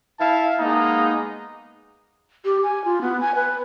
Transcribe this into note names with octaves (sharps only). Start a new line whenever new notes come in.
E4 E5 F5 A5
G#3 A#3 B3 D#4
G4
G#5
F4
B3
G#5
B4